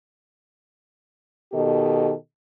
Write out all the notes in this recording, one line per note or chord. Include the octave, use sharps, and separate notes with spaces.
B2 D#3 G4 A4 D#5